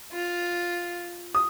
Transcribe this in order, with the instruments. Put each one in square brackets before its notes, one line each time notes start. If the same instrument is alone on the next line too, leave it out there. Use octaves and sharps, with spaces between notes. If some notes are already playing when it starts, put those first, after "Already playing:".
[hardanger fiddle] F4
[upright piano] D#6